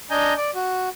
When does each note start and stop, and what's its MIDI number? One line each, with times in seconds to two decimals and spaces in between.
0.11 0.34 62
0.11 0.34 75
0.11 0.34 80
0.11 0.34 82
0.11 0.34 91
0.37 0.51 74
0.55 0.89 66